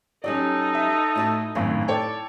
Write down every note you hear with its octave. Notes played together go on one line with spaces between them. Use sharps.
F#3 G3 C#4 D#4 A4 D5
E5
A2 F#4 A5
G#1 F#2 A2
A4 C#5 D5 G5